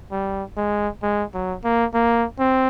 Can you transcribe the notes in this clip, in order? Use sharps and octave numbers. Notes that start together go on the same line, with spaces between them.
G3
G#3
G#3
F#3
A#3
A#3
C4